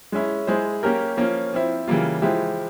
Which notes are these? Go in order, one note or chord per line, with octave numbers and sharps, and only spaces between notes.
G#3 C#4 E4
G#3 E4 G#4 C5
A#3 C#4 G4 A#4
F3 A#3 C#4
F3 C4 E4
C#3 E3 G3 A#3 F4
F3 G#3 E4 G4